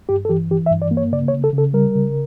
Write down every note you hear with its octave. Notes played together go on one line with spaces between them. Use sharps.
G2 G4
A4
E3 G4
E3 G4
E5
G2
D5
A#3
C#5
C#3 D5
C#5
C#3
A4
C#3
A4
G3 A#4
C#3